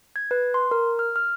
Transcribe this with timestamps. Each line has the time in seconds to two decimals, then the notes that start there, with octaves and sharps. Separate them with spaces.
0.16 G#6
0.31 B4
0.54 C6
0.71 A#4
0.99 F6
1.16 F6